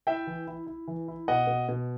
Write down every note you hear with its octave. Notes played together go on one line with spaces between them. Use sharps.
E4 E5 G5
E3
E4
E4
E3
E4
B2 D#5 F#5
B2
B2